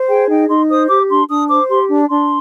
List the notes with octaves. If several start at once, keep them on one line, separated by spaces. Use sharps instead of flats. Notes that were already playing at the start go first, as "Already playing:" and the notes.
Already playing: C5
G#4 G5
D#4 G5
D#4 C6
C5 D#6
G4 D6
D4 C6
D4 D#6
C5 D6
G4 C6
D4
D4 C6